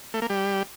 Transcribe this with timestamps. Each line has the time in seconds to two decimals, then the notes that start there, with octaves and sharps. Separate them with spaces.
0.14 A3
0.22 A#3
0.30 G3